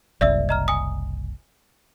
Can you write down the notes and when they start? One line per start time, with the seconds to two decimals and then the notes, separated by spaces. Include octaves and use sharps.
0.21 F#1 C2 D5 E5 E6
0.49 D#5 A#5 F6
0.68 G#5 D#6